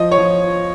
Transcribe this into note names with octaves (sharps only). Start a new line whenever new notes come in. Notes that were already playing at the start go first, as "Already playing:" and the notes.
Already playing: F3 D#5
C#5
F3